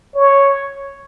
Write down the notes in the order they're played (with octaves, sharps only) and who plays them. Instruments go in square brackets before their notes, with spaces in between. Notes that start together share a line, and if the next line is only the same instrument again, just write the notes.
[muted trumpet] C#5